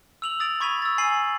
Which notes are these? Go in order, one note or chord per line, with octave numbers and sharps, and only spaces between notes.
E6 F7 F#7
D#6 A6 D7 F7
B5 C#6 G#6 B6 D#7 F7
E6 A6
G#5 C7 F#7